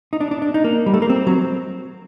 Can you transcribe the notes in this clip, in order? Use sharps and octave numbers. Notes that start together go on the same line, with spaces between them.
D#4
D4
D4
D4
D#4
A#3
G3
A3
A#3
C4
F#3